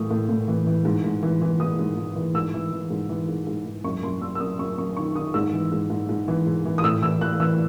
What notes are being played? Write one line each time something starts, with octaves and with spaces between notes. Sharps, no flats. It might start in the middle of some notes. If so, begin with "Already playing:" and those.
Already playing: A2 E3 C#6 D#6
A2
A2
E3
E3
G#2
G#2
E3
E3
E3 D#6
G#2
G#2
E3
G#2 E6
E3
E3
G#2
E3
G#2
G#2
G#2
F#2 C#6
F#2 C6
F#2 E6
E6
F#2 D#6
F#2 C#6
F#2 C#6
D#3 C#6
D#3 D#6
G#2 E6
E3
G#2
G#2
G#2
E3
G#2
E3
D#6
A2 E6
E3 E6
E3 F#6
E3 E6